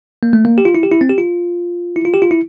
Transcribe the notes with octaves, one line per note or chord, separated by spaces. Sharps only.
A#3
A3
A#3
G4
F4
E4
G4
E4
C4
G4
F4
E4
F4
G4
F4
E4